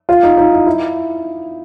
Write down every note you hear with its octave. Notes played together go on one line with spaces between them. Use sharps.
F4
D#4
D#4
E4
E4